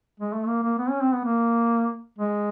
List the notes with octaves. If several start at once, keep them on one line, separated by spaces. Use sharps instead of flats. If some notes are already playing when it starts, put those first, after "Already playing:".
G#3
A3
A#3
A#3
B3
C#4
C4
B3
A#3
G#3